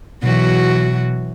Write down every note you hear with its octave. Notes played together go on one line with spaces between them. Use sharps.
B2 E3 F#3 F#4